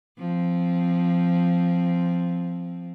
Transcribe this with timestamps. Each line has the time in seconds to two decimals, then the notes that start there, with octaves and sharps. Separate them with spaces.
0.18 F3 C4